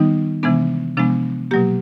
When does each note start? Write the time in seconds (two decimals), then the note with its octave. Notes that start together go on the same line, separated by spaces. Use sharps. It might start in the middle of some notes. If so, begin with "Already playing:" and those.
Already playing: D#3 G3 B3 D#4
0.43 C3 E3 G#3 B3 D4
0.97 C3 F3 G#3 B3 D4
1.51 B2 F#3 A#3 G4